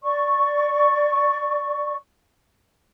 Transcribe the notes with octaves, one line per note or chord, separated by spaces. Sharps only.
D5 C#6